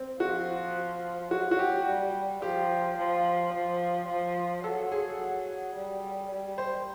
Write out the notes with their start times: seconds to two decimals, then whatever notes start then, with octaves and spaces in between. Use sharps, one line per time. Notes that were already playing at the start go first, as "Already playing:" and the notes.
Already playing: C4
0.20 F3 F#4
1.31 F#3 F#4
1.51 F#4
1.59 G4
1.87 G3
2.42 F3 G4
2.97 F3
3.53 F3
4.08 F3
4.64 F#3 A4
4.92 G#4
5.19 F#3
5.75 G3
6.31 G3
6.58 C5